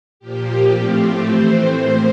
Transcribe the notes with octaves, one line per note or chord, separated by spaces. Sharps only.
A#2 F3 A#3 G4
A2 F3 A3 C4 G4
E3 A3 C4 C5
A2 F3 A#3